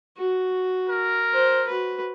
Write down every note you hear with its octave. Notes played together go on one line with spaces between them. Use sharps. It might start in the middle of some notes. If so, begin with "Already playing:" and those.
F#4
A#4
C5
F#4 B4